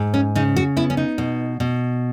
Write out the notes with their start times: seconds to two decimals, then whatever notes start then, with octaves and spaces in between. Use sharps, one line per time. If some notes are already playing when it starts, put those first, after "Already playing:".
Already playing: G#2
0.14 C#4
0.35 C#3 D#4
0.56 F#4
0.77 B3 E4
0.90 C#4
0.97 D#4
1.18 B2
1.60 B2